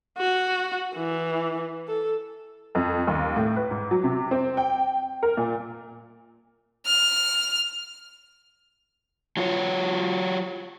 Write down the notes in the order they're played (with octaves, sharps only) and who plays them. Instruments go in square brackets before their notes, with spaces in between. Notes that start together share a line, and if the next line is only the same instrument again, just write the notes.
[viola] F#4
E3
A4
[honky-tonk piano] F2
D#2
A2
B4
G#2
F#3
C3
C4
G5
A#4
A#2
[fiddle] F6
[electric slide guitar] F#3 F4 C#5